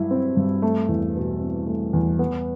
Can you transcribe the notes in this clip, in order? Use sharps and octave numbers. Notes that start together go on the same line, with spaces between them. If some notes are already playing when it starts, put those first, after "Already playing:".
Already playing: G2 F#3 E4
C4
G2
A3
E2
B2
C4
A3
E2
B3